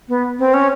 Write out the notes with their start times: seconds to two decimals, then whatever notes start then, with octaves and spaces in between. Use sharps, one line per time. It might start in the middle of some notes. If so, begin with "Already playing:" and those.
0.09 B3
0.39 C4
0.54 C#4